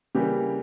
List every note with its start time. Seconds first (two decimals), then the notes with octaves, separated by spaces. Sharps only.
0.15 C#3 E3 G3 A#3 G4